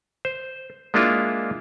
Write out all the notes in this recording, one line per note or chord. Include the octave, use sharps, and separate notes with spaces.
C5
G#3 A#3 D4 E4 F4